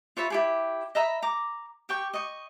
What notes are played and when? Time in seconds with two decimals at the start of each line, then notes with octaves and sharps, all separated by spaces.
0.17 F4 C#5 E5 B5
0.30 E4 G4 G#4
0.95 D#5 E5 A#5 B5
1.22 A#5 D6
1.89 G4 G5 C#6
2.14 D#5 C#6